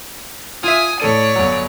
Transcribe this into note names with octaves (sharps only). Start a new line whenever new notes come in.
F4 E5 G#5 D#6
A2 A4 C#5 D5 D#7
G1 F#3